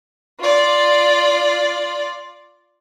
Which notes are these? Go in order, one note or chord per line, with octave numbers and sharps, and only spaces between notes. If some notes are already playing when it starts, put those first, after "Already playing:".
F4 D5